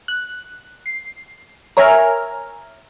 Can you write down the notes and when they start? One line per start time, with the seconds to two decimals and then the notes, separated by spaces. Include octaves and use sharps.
0.08 F#6
0.86 C7
1.77 A#4 C#5 E5 G#5 A#5 F6